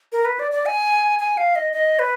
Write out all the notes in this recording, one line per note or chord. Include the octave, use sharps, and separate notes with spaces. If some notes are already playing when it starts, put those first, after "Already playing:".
A#4
B4
D5
D5
G#5
G#5
F5
D#5
D#5
B4